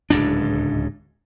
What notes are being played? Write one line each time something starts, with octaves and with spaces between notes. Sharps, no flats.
D1 C#2 G#2 D4